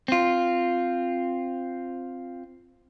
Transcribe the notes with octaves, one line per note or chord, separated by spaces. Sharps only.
C4 F4